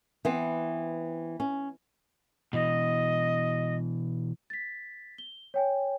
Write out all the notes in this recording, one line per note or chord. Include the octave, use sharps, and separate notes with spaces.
E3 B3 C4
C#4
B2 E3 D#5
A6 B6
G7
C#5 G5 G#5